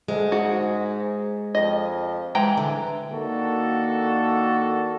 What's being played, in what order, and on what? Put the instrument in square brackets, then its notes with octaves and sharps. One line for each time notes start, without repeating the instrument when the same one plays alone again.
[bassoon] D2 [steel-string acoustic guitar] G#3
[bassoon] G#2 [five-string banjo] F#4
[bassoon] F2 [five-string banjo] D#5
[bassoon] E3 [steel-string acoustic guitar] G3 [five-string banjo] G#3 G5 A#5
[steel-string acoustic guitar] D3
[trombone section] D#3 A#3 D4 F#4 A4